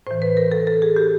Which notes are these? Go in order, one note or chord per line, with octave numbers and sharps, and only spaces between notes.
A2 E3 C5
B4
A#4
A4
A4
G#4
G4